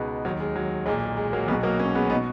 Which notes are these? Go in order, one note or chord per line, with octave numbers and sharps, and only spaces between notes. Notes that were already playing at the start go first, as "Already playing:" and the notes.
Already playing: C#2 B2 G#3 B3 D#4
D#2 D#3 F#3
G#3
F#3
B1 A#2 G#3
G#3
F#3 A#3
B1 B2 G#3 B3
F#3 A#3
A#3 C#4
G#3 B3
B3 D#4
B2